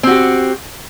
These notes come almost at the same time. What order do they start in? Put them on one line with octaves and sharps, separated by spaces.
C4 F#4 G4